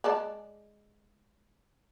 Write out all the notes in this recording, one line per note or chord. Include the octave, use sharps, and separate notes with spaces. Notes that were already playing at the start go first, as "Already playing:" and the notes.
G#3 D5 A5